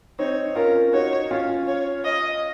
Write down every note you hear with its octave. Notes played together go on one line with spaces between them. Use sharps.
C4 D#4 C#5
C#4 F4 A#4
D#4 F#4 C#5
C#4 F4
C#5
D#5